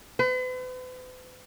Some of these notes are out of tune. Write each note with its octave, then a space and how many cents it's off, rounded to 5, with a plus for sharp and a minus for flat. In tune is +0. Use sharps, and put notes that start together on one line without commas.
B4 +45